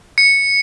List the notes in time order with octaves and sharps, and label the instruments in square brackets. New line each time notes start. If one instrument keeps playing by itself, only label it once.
[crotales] C#7